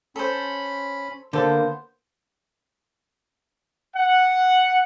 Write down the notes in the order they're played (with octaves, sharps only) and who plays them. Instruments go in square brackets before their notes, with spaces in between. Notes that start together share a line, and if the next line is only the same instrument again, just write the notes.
[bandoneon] C#4 B5 [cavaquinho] A4 C5
[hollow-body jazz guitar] D3 A4 [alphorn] A#3 [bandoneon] B3 [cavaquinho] C5
[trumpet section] F#5